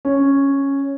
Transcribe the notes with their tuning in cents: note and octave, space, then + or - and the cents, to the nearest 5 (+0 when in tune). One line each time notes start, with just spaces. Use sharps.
C#4 -5